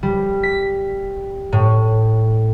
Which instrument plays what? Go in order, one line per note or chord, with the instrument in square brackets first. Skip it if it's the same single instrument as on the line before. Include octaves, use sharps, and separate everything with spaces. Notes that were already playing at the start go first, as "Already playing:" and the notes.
[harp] G3
B6
A2